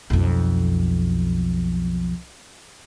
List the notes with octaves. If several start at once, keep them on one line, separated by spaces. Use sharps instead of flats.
B1 F2